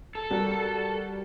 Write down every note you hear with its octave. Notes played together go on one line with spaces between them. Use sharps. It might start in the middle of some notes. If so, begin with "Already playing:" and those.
A4
G3 F#4 A#4